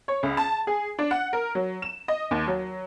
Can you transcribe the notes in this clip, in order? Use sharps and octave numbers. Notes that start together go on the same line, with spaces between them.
C#5
C#2
A5
G#4
D4
F#5
A#4
F#3
E7
D#5
D#2
F#3